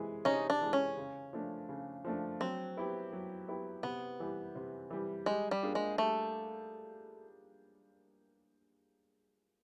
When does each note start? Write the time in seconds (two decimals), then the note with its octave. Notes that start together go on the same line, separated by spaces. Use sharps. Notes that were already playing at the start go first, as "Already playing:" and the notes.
Already playing: C3 E3 G#3
0.25 C3 C#4 D#4
0.50 D4
0.61 E3 G#3
0.73 C#4
0.97 C#3
1.33 F3 A3 D4
1.69 C#3
2.05 F3 A3 D4
2.41 F#3 C4
2.77 B3 E4 G4
3.13 F#3
3.48 B3 E4 G4
3.83 C3 B3
4.20 E3 G3
4.55 C3
4.90 E3 G3
5.26 G3 G#3
5.51 G3
5.62 A#3 D4 F4 G#4
5.75 G#3
5.98 G3 A3